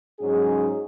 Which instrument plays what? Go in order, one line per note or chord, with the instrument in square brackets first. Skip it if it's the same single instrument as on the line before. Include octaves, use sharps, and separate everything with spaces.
[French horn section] G#2 F#3 C#4 G#4